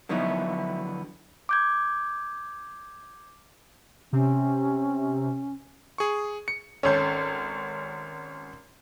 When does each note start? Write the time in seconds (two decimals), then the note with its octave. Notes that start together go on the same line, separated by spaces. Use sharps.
0.09 D3 F3 F#3 B3 D#4 E4
1.49 D6 G6 G#6
4.13 C3 C#4
5.98 G#4 C#6
6.48 C#7
6.83 G#1 C#4 A4 G6